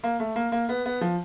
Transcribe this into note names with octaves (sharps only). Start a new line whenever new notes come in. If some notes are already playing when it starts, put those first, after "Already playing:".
A#3
A3
A#3
A#3
B3
B3
F3